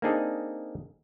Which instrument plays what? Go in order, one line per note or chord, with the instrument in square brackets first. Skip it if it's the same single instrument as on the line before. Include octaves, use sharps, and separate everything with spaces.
[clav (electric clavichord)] A#3 C4 D4 D#4 G#4 A4